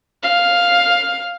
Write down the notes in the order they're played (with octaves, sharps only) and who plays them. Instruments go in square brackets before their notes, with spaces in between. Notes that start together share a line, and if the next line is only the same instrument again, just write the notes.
[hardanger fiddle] F5